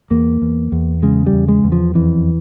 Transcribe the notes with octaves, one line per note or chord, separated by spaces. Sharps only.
E2 A#3
E2
E2
C#3 G#3
G3
E2
G#3
E2
F3
F2 E3